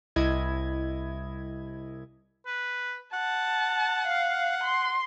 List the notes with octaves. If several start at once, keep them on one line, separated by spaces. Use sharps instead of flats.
C2 E4 D#5 G#6
B4
F#5 A5
F5
C6